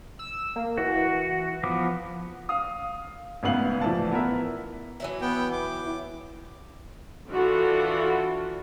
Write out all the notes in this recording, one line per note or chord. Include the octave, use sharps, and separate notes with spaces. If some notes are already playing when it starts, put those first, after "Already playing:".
E6
A#3
E3 F#4
F3 B3 D6
F5 D#6
G#1 D2 C#3 B3 F5 F#7
A2 E3 F3 D5 A5
B3 E4 A#4 E5
E3 F#3 E4
B3 G5
D6
E3 D4 F4 F#4 A4